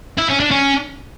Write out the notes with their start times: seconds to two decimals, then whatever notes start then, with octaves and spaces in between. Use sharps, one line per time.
0.18 E4
0.29 C#4
0.40 D4
0.51 C#4